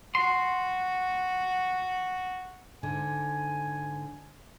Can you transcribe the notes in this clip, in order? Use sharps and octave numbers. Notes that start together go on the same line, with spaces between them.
F#4 C6
G#2 D3 G#5